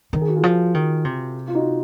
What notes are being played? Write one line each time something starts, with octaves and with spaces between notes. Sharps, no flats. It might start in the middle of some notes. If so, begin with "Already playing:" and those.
D#3 A#4
G#4
F#4
F4 G#4
F3
D#3
C3
F4
D#4 F#4